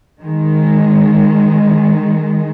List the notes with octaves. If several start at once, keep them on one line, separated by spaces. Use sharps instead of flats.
D#3 G#3